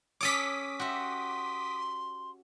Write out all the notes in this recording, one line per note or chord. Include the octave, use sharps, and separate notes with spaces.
C#4 A4 C#5 D6 D#6 B6
F#4 G4 E5 C6